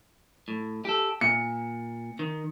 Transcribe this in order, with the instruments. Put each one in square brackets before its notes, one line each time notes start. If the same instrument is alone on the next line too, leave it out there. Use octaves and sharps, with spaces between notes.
[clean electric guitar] A2
G4 A4
[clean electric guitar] A#2 [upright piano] C#7
[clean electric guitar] D#3